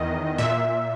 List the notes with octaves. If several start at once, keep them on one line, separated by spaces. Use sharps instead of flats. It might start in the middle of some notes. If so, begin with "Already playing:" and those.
Already playing: E2 D#3 D#5
A#2 E5